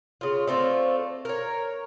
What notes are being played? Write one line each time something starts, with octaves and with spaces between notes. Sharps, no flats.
C#3 F4
A3 C4 F4 D5
A#4 C#5